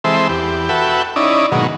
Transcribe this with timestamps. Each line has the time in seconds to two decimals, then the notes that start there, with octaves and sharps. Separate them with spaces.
0.04 E3 G#3 C4 A4 C5 E5
0.29 E2 G4
0.69 F#4 A4 B4 E5 G5
1.16 C#4 D#4 E4 D5
1.52 G#2 B2 D#3 F#3 A#3